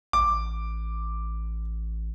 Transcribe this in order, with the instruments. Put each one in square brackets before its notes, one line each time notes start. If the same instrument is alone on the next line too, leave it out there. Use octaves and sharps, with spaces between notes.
[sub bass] A1 [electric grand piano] D6